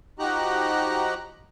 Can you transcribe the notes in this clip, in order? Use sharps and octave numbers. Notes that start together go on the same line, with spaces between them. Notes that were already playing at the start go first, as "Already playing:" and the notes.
F3 D#4 F#4 G4 A#5 F#6